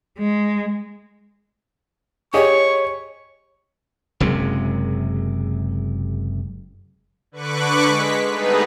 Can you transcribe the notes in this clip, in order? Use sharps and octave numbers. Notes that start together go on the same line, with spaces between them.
G#3
G4 G#4 C#5 D#5 C#6
F#1 F#2 C3 G#3
D3 B4 C#6 D6 F#6
G#3 B6
G3 A3 B3 D#4 G#4 B4